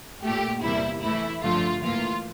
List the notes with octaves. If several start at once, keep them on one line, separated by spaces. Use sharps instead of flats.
A#2 A3 G4
E2 C3 G3 A#3 E4
A2 E3 A3 E4
G2 D3 F3 A3 F4
A2 E3 A#3 F4